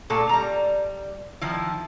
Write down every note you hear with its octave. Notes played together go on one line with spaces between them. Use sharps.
A#2 A3 A4
G3 A#5
D#3 F3 E4